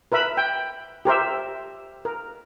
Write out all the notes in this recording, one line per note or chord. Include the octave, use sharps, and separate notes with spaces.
A#4 B4 E5 B5
G5
G4 A#4 C5 E5
A#4